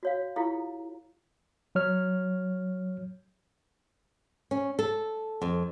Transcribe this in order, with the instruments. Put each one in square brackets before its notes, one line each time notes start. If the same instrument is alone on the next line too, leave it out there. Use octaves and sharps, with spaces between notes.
[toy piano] F#4 C#5 F5
E4 F4 G4 A4 F5 A#5
[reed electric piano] F#3 C#5 F6
[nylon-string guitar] C#4
A4
F2